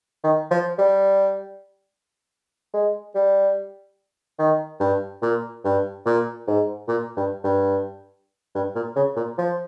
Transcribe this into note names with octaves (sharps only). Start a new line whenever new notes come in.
D#3
F3
G3
G#3
G3
D#3
G2
A#2
G2
A#2
G#2
A#2
G2
G2
G2
A#2
C#3
A#2
F3